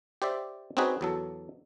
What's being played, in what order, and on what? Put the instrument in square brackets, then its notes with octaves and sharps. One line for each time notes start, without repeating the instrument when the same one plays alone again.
[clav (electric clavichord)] G4 C5 D5 E5
C4 C#4 D#4 F#4 G#4 B4
E2 F#3 A4